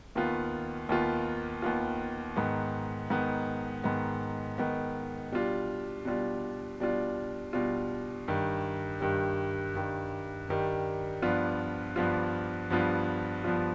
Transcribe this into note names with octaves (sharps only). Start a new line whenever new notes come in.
D#2 D#3 B3 F4
D#2 D#3 B3 F4
D#2 D#3 B3 F4
G#2 D#3 B3
G#2 D#3 B3
G#2 D#3 B3
G#2 D#3 B3
B2 G3 D4 F4
B2 G3 D4 F4
B2 G3 D4 F4
B2 G3 D4 F4
G2 D#3 G3
G2 D#3 G3
G2 D#3 G3
G2 D#3 G3
G2 F3 B3 D4 F4
G2 F3 B3 D4 F4
G2 F3 B3 D4 F4
G2 F3 B3 D4 F4